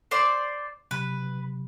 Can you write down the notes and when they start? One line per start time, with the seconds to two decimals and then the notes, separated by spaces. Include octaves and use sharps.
0.11 C5 D5
0.91 C3 F#3 B4